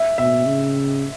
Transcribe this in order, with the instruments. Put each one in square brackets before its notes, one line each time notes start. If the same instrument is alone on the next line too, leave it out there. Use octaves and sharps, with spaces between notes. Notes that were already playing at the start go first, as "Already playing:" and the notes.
Already playing: [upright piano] E5
[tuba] B2 [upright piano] E5
[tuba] C#3